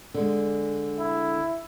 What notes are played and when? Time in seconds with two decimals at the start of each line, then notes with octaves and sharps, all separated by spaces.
0.14 D3 G#3
0.99 E4